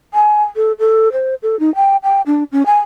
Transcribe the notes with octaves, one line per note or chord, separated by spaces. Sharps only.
G#5
A4
A4
C5
A4
D#4
G5
G5
D4
C#4
G#5